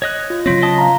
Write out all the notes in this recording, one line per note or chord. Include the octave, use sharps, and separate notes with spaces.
C#5 D#5 F#6
F4
C#3 F#3 C4 F4 C#5 A#6
D#5 A5 D#6
F5 A#5